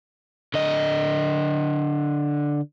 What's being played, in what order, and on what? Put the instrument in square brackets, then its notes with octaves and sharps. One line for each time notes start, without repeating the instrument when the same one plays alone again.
[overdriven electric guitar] D3 D#5